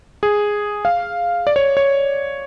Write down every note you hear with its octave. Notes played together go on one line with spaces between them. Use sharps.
G#4
F5
D5
C#5
C#5